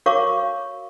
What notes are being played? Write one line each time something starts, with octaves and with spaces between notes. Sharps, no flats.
F#4 A#4 C#5 F5 C#6 D6